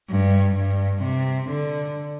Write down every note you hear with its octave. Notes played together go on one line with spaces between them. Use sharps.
G2
G2
C3
D3